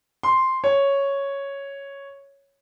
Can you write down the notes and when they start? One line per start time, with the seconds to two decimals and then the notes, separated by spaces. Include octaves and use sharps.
0.23 C6
0.64 C#5